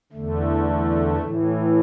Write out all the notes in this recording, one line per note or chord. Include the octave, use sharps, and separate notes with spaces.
E2 D3 A3
A2 E3